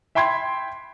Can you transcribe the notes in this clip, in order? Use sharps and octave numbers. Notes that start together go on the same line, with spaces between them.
E5 G5 B5 C6 G#6